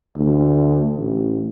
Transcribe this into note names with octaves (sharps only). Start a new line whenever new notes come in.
D2
A1